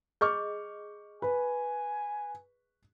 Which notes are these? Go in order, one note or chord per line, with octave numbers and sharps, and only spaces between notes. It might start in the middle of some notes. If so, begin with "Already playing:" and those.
G#4 D#5 C#6 D6 F6 G6
B4 G#5